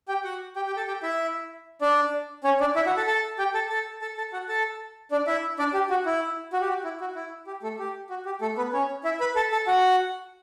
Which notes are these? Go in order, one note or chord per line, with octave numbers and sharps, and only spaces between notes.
G4 G5
F#4 F#5
G4 G5
G4 G5
A4 A5
G4 G5
E4 E5
D4 D5
C#4 C#5
D4 D5
E4 E5
F#4 F#5
A4 A5
A4 A5
G4 G5
A4 A5
A4 A5
A4 A5
A4 A5
F#4 F#5
A4 A5
D4 D5
E4 E5
D4 D5
G4
F#4
E4
F#4
G4
F#4
E4
F#4
E4
G4
A3 A4
G4
F#4
G4
A3 A4
B3 B4
C#4 C#5
E4 E5
B4 B5
A4 A5
A4 A5
F#4 F#5